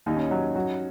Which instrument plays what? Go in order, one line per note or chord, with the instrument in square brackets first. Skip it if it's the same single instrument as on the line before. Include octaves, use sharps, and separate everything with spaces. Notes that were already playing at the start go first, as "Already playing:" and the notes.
[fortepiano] D#2 [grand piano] D#4
[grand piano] C#4
[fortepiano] F#3 [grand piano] D#4
[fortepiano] F#3 [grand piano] F#4